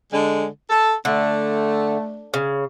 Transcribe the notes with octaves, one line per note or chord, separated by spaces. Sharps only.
D3 G#3
A4
D3 A3
C#3